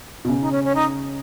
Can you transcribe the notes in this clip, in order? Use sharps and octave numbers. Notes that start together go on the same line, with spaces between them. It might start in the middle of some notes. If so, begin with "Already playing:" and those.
B2
C#3
D#4
C#4
C#4
D#4